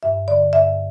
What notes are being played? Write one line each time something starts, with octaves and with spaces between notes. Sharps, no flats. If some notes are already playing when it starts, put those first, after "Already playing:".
G2 E5
D3 D5
G2 E5